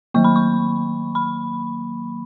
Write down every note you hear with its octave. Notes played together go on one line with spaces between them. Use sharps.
D#3 F#3 A#3 C#6
B5
C#6
B5